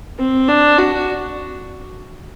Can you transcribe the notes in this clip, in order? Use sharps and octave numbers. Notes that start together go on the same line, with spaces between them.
C4
D4
F#4